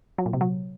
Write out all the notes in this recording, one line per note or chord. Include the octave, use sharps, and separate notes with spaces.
F#3
A#2
C3
F#3